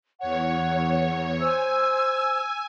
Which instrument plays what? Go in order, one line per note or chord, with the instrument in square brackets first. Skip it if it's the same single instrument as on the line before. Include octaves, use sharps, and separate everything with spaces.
[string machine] E2 C#5 [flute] F#5
[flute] C5 [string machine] G#5 [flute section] E6